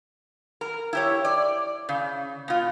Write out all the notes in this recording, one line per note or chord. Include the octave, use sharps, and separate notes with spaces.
A#4
E4 G4 C#5
D5
C#3
B2 F4